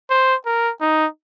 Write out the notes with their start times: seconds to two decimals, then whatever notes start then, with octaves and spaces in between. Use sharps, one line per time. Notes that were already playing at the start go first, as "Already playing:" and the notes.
0.10 C5
0.46 A#4
0.81 D#4